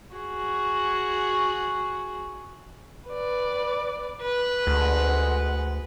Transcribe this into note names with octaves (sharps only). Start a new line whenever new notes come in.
F#4 G#4
B4 D5
B4
D2 G#3 F#5